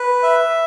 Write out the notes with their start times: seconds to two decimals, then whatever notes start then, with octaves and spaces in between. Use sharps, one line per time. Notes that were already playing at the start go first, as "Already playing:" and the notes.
Already playing: B4
0.23 E5